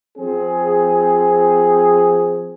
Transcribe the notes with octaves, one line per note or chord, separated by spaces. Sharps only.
F3 C4 G#4